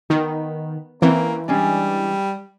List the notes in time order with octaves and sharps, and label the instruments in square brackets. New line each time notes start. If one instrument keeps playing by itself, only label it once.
[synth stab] D#3 [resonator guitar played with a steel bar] B3
[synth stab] E3 [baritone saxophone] A#3 [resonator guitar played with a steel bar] C4 C#4
[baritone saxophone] G3 [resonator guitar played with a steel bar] G#3 C#4 D4